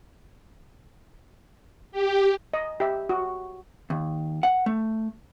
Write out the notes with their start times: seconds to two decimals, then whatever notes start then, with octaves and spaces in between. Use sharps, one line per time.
1.92 G4
2.54 D#5
2.80 G4 E5
3.09 F#4
3.90 D#2
4.43 F#5
4.66 A3